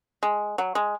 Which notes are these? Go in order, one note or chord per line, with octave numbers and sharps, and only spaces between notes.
G#3
F#3
G#3